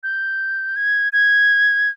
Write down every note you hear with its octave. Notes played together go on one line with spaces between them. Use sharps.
G6
G#6
G#6